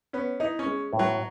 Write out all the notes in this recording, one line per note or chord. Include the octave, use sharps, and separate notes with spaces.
B3 C#4
D#4 E4
C#4
G#3
A2
F#3